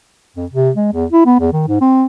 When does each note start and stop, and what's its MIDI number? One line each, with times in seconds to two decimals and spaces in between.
0.36 0.46 41
0.52 0.70 48
0.76 0.89 56
0.93 1.06 40
1.12 1.24 64
1.26 1.36 59
1.39 1.52 40
1.53 1.67 51
1.67 1.80 44
1.81 2.06 60